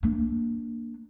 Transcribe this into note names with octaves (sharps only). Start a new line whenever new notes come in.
A#3 D4